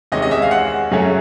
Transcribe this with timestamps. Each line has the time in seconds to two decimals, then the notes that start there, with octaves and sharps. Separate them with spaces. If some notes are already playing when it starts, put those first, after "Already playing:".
0.12 E2 C3 D#3 G#3 C#4 D#5
0.22 D#5
0.31 E5
0.42 F5
0.51 F#5
0.91 F#2 C#3 F#3 A3 C#4